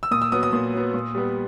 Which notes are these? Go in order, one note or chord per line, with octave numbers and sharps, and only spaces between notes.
E6
A#2 D#6
E6
F#3 B3 D#6
D#6
A#2
F#3 B3
A#2
G3 B3